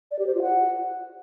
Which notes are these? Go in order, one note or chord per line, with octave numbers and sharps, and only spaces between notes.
D5
G4
C5
F4
F#5